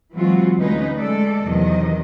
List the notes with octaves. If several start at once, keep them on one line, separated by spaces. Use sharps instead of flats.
E3 F#3 G#3 C4 F4 F#4
D2 G#3 C#4 D#4 B4
G#3 A3 A4 D5
E2 C3 D#3 F#3 D#5